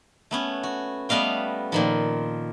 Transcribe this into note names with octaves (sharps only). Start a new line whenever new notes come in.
A3 B3 C#4
F#4
G3 A3 B3 D#5 F5 G5
A#2 D#3 F3